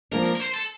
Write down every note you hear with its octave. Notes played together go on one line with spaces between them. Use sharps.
F3 A#3 D4 A#4
A#4
A#4
C5
A4